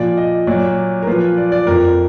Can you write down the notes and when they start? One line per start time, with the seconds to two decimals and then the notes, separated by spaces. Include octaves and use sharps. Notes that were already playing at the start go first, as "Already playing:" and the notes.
Already playing: A#2 F3 D5
0.17 D#5
0.47 A#2 F#3 D5
1.02 A#4
1.07 A#2 F3 B4
1.37 D5
1.52 D5
1.67 F2 F3 A#4